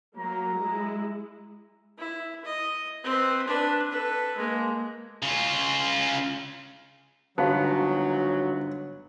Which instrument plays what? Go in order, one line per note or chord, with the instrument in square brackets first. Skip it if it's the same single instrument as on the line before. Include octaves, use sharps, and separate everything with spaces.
[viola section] F#3 A#3 [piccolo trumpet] A#5
[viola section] G#3 E4
[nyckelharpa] E4
D#5
C4 B4
D4 B4
A4 B4
G#3 A#3
[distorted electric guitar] C#3 F4
[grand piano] G1 [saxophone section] G#2 C#3 F#3 [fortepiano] B3 [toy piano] F#4 F5 A5